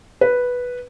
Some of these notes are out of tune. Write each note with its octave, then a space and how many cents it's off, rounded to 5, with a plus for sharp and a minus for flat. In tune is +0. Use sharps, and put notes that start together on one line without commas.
B4 -5